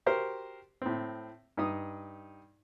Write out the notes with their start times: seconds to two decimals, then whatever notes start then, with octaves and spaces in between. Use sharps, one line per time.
0.06 F#4 G4 A#4 C5
0.82 A2 C4
1.57 G2 D#4 D#6